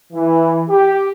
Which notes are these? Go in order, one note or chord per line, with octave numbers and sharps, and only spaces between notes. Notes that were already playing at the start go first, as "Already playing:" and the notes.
E3
G4